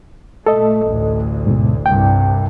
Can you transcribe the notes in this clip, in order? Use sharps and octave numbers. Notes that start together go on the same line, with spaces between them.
A#2 A3 A4 D#5
A1 D2
G#2 B2
C2 G2 G5